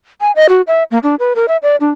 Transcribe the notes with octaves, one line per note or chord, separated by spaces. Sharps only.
G#5
D#5
F#4
E5
A#3
D4
B4
A#4
E5
D5
D4